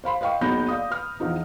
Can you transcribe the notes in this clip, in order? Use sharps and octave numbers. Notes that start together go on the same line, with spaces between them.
C5 F5 B5 C6
B4 D#5 F5 G5 C#6
F#1 F#3 B3 D#4 G6 A#6
D5 F5 D#6
B4 F6
E2 F3 D#4